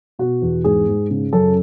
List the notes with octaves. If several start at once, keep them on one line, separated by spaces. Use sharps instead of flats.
B2 F#4
E2
G#2 G#4
G#2
C#3
F#2 A4